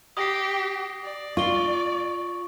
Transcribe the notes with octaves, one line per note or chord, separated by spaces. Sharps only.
G4 D#6 A#6 C7
D5
F4 C#6 G7